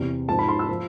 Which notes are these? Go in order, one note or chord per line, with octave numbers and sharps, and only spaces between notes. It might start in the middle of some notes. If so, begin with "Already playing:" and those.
Already playing: E2 C3 E3
G#2 F3 A5
B5
C6
E6
F3